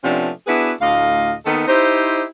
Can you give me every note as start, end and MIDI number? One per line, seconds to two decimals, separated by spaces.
0.04 0.30 48
0.04 0.30 53
0.04 0.30 57
0.04 0.30 59
0.04 0.30 61
0.04 0.30 62
0.47 0.72 59
0.47 0.72 62
0.47 0.72 64
0.47 0.72 66
0.47 0.72 68
0.47 0.72 71
0.81 1.33 38
0.81 1.33 45
0.81 1.33 75
0.81 1.33 77
1.46 1.63 51
1.46 1.63 58
1.46 1.63 59
1.46 1.63 63
1.46 1.63 69
1.68 2.23 63
1.68 2.23 64
1.68 2.23 67
1.68 2.23 72